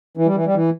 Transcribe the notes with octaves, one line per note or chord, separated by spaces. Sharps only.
E3
G3
E3
G3
E3